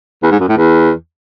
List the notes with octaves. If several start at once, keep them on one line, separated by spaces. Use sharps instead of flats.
E2
G#2
F#2
A2
E2